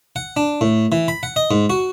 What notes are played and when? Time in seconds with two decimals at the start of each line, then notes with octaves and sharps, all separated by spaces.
0.16 F#5
0.37 D4
0.61 A2
0.92 E3
1.08 B5
1.23 F#5
1.36 D#5
1.51 G#2
1.70 F#4